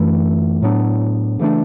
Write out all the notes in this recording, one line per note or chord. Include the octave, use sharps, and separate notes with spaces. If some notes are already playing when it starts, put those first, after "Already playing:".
Already playing: F#2 E3 A3
A2 F#3 B3 D4
C#3 E3 A3 D4